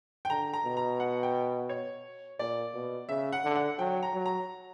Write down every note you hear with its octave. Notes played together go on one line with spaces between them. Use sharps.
G5
D3 A#5
A#5
B2
A#5
F#5
G5
C#5
A#2 D5
B2
C#3 E5
F#5
D3
F#5
F#3 G5
A#5
F#3
A#5